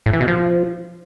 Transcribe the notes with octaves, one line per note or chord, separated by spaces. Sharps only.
A2
E3
B2
F3